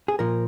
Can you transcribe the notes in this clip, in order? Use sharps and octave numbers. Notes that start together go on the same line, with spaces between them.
G#4
A#2 F3 A#4